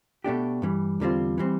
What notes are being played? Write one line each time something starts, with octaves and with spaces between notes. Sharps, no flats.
B2 A3 D4 G4
G2 E3 G3
E2 D3 G3 C4 F4
E3 G3 C4